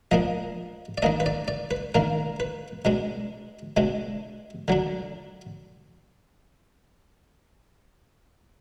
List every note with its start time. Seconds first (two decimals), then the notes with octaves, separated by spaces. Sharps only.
0.11 F3 A#3 D4 D#5
0.98 D5
1.02 D#3 A#3 D4 D#5
1.20 B4
1.26 D5
1.48 D5
1.71 B4
1.95 D#3 A#3 D4 A#4
2.40 B4
2.85 B2 G#3 D4
3.77 B2 G#3 D4
4.68 D3 F#3 D4